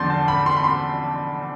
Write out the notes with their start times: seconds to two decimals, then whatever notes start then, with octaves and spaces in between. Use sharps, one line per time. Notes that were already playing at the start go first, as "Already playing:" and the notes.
Already playing: E2 D3 F3 C6 G6 A6
0.10 A5
0.28 B5
0.46 C6
0.56 B5
0.64 C6